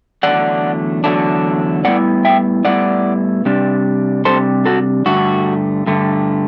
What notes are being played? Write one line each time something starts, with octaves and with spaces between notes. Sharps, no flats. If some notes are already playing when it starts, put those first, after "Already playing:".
E2 D3 F#3 A3 D4 D5 F#5
E2 D3 F#3 A3 D4
A2 G3 B3 E4 D5 F#5
E5 G5
A2 G3 B3 E4 D5 F#5
C3 G3 D4
C3 G3 D4 A4 C5
F#4 A4
G2 D3 A3 F#4
G2 D3 A3